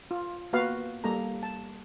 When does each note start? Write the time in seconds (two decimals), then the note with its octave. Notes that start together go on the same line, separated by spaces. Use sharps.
0.11 F4
0.53 A#3 B3 F#4 B4 F5
1.04 G3 A#3 A4 A#5
1.43 A5